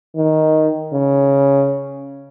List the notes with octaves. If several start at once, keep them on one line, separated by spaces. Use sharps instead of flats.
D#3
C#3